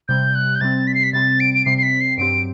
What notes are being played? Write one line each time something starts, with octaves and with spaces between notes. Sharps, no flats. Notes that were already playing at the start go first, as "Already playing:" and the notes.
C3 G3 C4 G6
F#6
G6
C3 G3 C4 A6
B6
C7
B6
C3 G3 C4 A6
D7
D7
C3 G3 C4 C7
C7
B6
C7
G2 F#3 C4 G4 D7